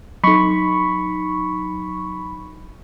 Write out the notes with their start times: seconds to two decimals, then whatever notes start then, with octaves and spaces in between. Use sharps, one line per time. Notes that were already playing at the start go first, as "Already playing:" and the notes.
0.24 F#3 D#4 B5 C#6